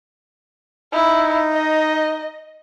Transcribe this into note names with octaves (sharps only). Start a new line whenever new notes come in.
D#4 E4
D#5